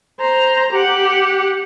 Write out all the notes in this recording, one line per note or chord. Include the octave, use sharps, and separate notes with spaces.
C5 A#5
G4 F#5